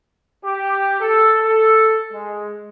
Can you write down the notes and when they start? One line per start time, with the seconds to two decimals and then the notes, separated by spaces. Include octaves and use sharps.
0.44 G4
1.00 A4
1.41 A4
2.12 G#3